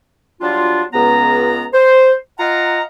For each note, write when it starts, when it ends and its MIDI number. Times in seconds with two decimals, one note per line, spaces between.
0.41 0.82 54
0.41 0.82 55
0.41 0.82 62
0.41 0.82 65
0.93 1.64 37
0.93 1.64 59
0.93 1.64 82
1.73 2.12 72
2.38 2.81 65
2.38 2.81 75
2.38 2.81 77
2.38 2.81 78
2.38 2.81 82